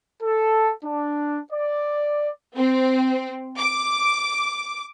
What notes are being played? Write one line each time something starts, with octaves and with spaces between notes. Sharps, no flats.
A4
D4
D5
C4
D6